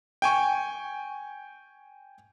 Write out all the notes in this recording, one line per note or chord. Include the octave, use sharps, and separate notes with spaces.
G5 G#5 C#6